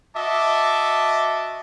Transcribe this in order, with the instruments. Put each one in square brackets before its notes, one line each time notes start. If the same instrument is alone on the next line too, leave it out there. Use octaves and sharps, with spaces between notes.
[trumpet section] F#4 D#5 E5 A5 D6